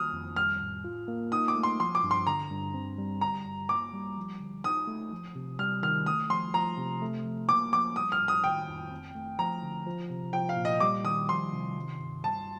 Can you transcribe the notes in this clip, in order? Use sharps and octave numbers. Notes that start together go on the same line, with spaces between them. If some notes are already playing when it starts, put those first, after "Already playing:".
Already playing: D#3 A#3 D#6 F6
F2
G3 F6
A2
F4
A#3
D#4 D#6
D6
A3
C6
F3 C6
D6
G2
C6
D3 A#5
G2
C4
G3
D3 A#5
G2
A#3 D6
G3
F3
D3
D#4 D#6
A3
F3
C3
G3 F6
D#3 F6
A3 D#6
F3 C6
F3 A#5
C3
A3
F3
A#3 D6
F3 D6
G3 D#6
F6
A2
D#6
D#3 G5
F2
C4
A3
F3 A#5
D3
F3
C3
F3 G5
F5
A#2
D#5
G3 D6
D#3 D#6
F3 C6
C3
D#3
G2
G3 A5